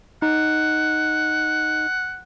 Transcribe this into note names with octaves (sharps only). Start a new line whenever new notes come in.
D#4 F#5